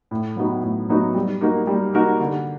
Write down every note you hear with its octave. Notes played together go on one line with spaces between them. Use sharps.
A2
F#3 B3 D#4 F#4
A2
F#3 B3 D#4 F#4
G3
A#3 D#4 F#4 A#4
G3
A#3 D#4 F#4 A#4
D3